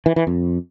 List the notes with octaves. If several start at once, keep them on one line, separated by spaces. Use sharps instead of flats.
E3
E3
F2